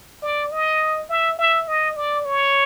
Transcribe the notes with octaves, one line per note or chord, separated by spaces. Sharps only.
D5
D#5
E5
E5
D#5
D5
C#5